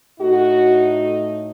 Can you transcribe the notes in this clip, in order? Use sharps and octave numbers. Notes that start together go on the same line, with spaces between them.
A2 A3 D#4 F#4